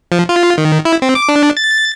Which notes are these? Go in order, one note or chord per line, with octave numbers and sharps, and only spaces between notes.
F3
F4
D#3
E4
C4
D6
D4
A6